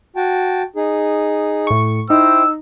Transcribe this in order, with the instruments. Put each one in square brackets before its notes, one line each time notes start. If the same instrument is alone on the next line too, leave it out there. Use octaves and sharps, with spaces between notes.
[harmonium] F#4 G5 A5
D#4 G#4
[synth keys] A2 C#6
[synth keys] D#4 [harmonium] E4 C5 G5 [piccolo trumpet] E6